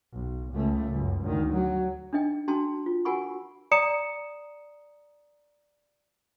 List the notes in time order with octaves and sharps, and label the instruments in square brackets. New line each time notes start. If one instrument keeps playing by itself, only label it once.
[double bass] B1
C#2 A3
F#1 C#2
D2 D#3
F#3
[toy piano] D4 D#4 D#5 G5
D4 F#4 G5 A5 A#5 C6
F4
F#4 A#4 F#5 G#5 B5 C#6
[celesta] D5 A#5 D#6 C#7 E7